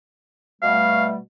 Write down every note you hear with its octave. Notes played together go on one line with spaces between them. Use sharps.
B2 G3 A3 F5